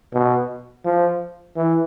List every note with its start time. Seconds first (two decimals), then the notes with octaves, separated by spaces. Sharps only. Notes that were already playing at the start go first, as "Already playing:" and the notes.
0.13 B2
0.85 F3
1.56 E3